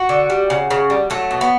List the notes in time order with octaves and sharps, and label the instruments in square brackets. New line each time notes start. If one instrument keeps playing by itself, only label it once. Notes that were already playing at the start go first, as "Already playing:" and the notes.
Already playing: [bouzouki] F#4
D3
G3
C#3
C#3
G3
F#3 A3
B2
B3